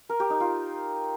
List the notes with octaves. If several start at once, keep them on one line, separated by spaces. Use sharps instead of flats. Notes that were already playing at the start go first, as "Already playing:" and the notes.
A#4
G4
D#4
F4